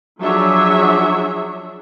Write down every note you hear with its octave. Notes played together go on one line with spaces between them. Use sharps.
F3 F#3 D4 G#4 C#5 E5